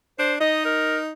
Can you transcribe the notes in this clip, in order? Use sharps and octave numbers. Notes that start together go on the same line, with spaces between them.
D4 C5
D#4 D#5
A#4